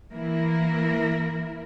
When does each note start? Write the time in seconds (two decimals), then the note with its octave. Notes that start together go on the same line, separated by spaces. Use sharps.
0.14 E3 A#3 E4 A#4